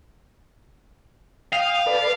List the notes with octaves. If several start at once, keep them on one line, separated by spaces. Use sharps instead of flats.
F5 G5 D#6
A4 B4 D5